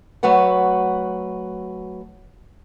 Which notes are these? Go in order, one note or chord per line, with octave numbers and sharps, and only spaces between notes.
F#3 A3 F#4 B4 F#5